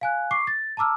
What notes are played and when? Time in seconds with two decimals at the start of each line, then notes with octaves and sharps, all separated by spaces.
0.01 F5 G#5 F#6
0.31 C#6 D6 C7
0.47 A6
0.77 A5 A#5 D6 E6 F6